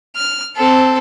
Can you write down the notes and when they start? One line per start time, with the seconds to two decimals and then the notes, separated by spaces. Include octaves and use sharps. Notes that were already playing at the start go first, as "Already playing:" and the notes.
0.16 F6
0.57 C4 A4